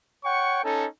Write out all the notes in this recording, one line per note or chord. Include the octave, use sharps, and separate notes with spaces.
C#5 F#5 G5 C#6
C#4 D#4 A4